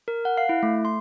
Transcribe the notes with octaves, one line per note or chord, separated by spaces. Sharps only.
A#4
F#5
F5
E4
A3
C6